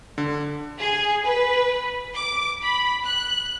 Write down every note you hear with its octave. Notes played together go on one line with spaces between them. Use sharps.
D3
G#4
B4
D6
B5
F#6